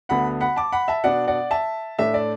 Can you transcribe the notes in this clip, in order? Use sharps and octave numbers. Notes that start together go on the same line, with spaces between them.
D2 D3 B3 F#5 B5
F#5 B5
A5 D6
F#5 B5
E5 A5
B2 B3 D4 D5 F#5
D5 F#5
E5 A5
A2 A3 D4 E5
D5